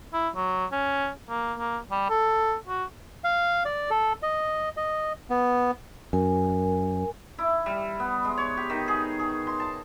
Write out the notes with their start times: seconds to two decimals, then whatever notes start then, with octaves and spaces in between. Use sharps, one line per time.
0.14 E4
0.35 F#3
0.72 C#4
1.29 A#3
1.59 A#3
1.91 G3
2.10 A4
2.67 F#4
3.24 F5
3.65 D5
3.90 A4
4.23 D#5
4.77 D#5
5.30 B3
6.13 F#2 A#4 G#5
7.39 E4
7.66 G3
8.00 B3
8.25 G#3
8.37 C#5
8.57 G4
8.70 D#3
8.88 G#4
9.19 G#4
9.47 C6
9.60 A5